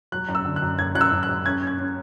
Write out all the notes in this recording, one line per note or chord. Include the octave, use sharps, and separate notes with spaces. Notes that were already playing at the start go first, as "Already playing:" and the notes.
F#3 F#6
F#2
E6
D3
F#6
F#2
F#2 G#6
F#2 F#6
E6
F#2
F#6
F#2
C#4 G#6
C#4
G#6
C#4